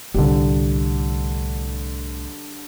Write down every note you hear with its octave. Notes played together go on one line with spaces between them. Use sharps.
C2 A2 D3 G3